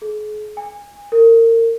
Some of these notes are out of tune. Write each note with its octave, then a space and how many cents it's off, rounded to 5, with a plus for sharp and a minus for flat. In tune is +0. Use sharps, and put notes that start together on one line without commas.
G#4 +40
G#5 -25
A#4 -30